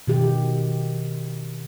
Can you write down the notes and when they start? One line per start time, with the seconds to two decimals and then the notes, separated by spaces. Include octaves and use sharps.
0.07 B2 D#3 G4